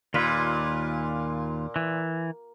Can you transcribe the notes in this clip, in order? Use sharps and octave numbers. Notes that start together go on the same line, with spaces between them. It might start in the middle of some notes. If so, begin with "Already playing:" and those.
D#2 A#2 F4 B4
E3